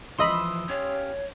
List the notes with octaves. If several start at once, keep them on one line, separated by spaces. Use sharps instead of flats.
C#2 E3 F3 D#5 B5 C6 D#6 E6
C#4 G4 C#5 F5